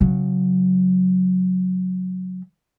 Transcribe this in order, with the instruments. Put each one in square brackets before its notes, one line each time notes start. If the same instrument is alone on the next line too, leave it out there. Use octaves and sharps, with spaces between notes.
[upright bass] C#3 F#3